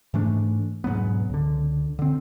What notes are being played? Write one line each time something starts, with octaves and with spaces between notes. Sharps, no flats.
G#2 E3 A3 D4
E1 G#2 F#3 B3
C#2 D3
D3 C4